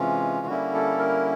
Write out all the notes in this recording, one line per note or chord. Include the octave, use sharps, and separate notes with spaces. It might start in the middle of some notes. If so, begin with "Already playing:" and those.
Already playing: C3 E3 G#3 C#4 F4
D3 G3 A#3 C#4 E4 F#4
A4
A#4